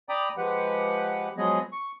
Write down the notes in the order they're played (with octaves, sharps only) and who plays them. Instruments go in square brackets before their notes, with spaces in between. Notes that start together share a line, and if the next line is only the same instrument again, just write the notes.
[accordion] D5 G5 A#5 B5 D6 D#6
F3 G#3 G4 B4 F#5
F3 F#3 G#3 B3 G#4 D#5
C#6